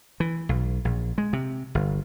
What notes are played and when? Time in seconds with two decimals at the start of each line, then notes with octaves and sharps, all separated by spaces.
0.20 E3
0.49 B1
0.85 A#1
1.18 G#3
1.33 C3
1.75 G1